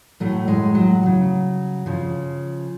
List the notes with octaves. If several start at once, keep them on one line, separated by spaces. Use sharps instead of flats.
A2 F#3 A3
G#3
F#3
C#3 F#3
C#3 F3